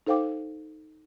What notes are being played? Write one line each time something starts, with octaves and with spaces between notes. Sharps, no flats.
D#4 A4 C5 F5 G5 D6